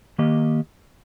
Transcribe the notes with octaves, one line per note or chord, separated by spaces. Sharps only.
D#3 A#3 G4 D#5